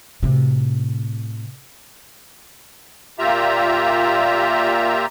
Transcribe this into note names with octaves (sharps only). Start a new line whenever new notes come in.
A2 C3
A#2 F4 G4 E5 A#5